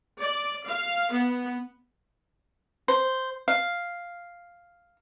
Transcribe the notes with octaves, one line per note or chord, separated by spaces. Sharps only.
D5
F5
B3
C5
F5